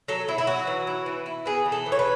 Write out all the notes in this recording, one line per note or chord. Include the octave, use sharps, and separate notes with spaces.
F#3 A4
F#3 E4
E4
F#3 F#4
E3
E4
E3
E4
B3 G#4
E3
A4
E3
C#5
B4